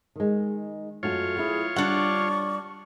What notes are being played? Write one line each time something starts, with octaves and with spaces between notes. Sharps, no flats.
D#3 G#3
F#2 A3 F4 F#4 C#5
B3 E4 G#4
G3 D4 F#5 C#6